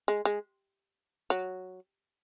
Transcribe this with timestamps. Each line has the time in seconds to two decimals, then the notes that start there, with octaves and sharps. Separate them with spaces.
0.08 G#3
0.25 G#3
1.30 F#3